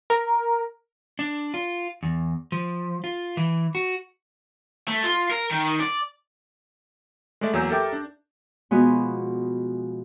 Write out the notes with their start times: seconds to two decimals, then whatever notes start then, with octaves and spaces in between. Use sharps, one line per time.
0.10 A#4
1.19 D4
1.54 F4
2.03 E2
2.52 F3
3.04 F4
3.37 E3
3.75 F#4
4.88 A3
5.04 F4
5.31 A#4
5.51 D#3
5.80 D5
7.41 G#3 A3 A4 D5 E5
7.53 E2 F#3 A#3 G#5 E6 G6
7.70 G4 A4 A#4 E5 G5 D6
7.93 D4
8.71 B2 F3 G#3 B3 F#4 G#4